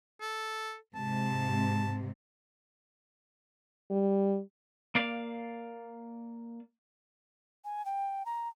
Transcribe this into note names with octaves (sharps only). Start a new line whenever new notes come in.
A4
G#2 C3 A5
G3
A#3 D5 F5
G#5
G5
A#5